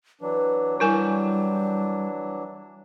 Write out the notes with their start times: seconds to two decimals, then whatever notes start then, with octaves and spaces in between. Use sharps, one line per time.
0.21 E3 F#3 D4 B4
0.80 G3 E4 A#4 G#5